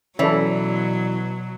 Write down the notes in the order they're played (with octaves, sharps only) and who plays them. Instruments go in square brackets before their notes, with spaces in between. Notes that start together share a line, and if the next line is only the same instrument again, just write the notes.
[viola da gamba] B2 F#3 [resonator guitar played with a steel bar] E3 [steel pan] C#4 A4 [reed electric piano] C#5 D5